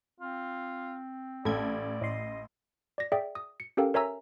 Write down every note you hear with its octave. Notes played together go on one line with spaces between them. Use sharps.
C4 F4
A1 A4 D5 G#6
A2 D#5 C6
D5 A#6
G#4 D5 E5 G5
D#6
C#7
C#4 G4 A4 A#4 F5 G5
A#4 C#5 E5 G#5 A#5 E6